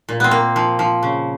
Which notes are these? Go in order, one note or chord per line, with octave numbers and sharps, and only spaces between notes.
A#2
B3 C4
A#3
F3
F3
C#3